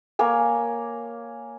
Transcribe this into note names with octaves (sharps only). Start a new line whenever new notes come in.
A#3 C#5 G#5